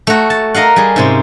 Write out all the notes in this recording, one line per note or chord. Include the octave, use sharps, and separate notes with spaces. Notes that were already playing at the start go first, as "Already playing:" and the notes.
A3 F#4
A5
A#4 D#5 F5 F#5
G3 G#4
G#2 C3 C#4